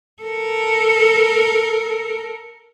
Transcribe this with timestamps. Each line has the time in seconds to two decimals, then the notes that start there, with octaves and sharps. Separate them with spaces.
0.22 A4 A#4